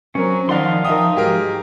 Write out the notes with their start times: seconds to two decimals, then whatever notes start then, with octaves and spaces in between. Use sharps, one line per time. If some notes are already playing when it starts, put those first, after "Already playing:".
0.15 F#3 C4 C#4 A#4
0.49 D#3 F3 D#4 D5 F5 F#5 C6
0.85 F3 D#4 A#4 E5 G5 D#6
1.17 G#2 F#3 G4 G#4 A#4